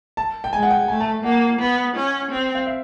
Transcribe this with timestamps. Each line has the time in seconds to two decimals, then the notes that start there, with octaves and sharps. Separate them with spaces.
0.17 A5
0.44 G5
0.53 G#3 G#5
0.63 F#5
0.71 G5
0.88 A3 G#5
1.00 A5
1.24 A#3 F#5
1.59 B3
1.96 C#4
2.31 C4
2.55 F5
2.66 E5